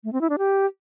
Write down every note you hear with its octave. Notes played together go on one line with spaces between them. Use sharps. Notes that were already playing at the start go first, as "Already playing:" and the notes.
A3
C4
E4
D4
G4